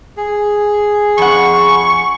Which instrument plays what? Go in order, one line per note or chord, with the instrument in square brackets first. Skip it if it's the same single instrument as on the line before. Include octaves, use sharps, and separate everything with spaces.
[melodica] G#4
[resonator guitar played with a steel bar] F2 F#5 [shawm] C#6